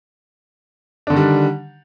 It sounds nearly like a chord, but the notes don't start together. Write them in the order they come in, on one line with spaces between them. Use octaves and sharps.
D4 D3 D#3 G3